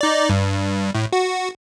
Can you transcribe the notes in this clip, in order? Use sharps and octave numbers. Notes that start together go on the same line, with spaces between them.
D#4 D5
G2
A2
F#4